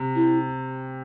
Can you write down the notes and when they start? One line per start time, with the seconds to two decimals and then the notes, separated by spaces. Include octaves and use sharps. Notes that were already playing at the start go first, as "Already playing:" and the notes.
Already playing: C3
0.16 E4